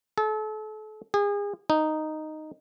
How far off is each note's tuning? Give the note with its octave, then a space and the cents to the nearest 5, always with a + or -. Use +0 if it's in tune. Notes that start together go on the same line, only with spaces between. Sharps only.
A4 -35
G#4 -35
D#4 -5